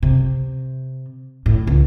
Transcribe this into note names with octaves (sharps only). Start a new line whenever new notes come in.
C3
A2
C#2